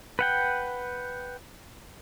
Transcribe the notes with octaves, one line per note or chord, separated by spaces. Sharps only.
B4 F#5 G5